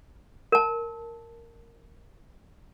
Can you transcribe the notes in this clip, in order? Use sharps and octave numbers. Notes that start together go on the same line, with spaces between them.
A#4 A5